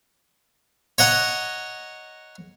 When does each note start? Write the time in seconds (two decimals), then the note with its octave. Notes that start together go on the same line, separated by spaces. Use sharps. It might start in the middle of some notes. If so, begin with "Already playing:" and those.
0.98 C#5 D#5 F#5 A#5